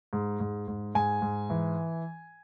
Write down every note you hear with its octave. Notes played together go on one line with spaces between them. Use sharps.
G#2
G#2
G#2
G#2 G#5
G#2
E3